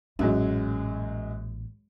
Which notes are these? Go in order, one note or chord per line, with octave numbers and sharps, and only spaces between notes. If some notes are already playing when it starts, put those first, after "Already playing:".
A1 F#2 A#2 F#3 G#3